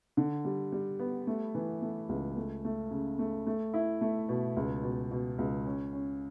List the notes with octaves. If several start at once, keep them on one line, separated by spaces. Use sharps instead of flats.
D3
G3
G3
B3
A3
E3
A3
C#2
A3
A3
C#3
A3
A3
E4
A3
B2
C#2
B2
B2
C#2
C#4
C#4